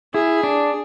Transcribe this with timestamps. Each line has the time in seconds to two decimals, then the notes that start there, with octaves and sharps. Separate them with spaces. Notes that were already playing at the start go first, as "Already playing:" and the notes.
0.14 E4 G#4
0.43 D4